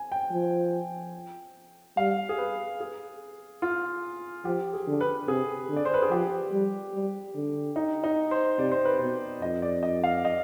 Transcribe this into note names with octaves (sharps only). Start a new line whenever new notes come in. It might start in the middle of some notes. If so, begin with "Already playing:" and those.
Already playing: G#5
G5
F3
G3 F5
G#4
B4
G#4
F4
F3 G4
G#4
D3
B4
C3 G#4
D3
D5
C5
B4
G#4
F3 G4
G3
G3
D3
D#4
D#4
C5
C3 D5
C5
B4
B2 C5
F2 D#5
D5
D#5
F5
D#5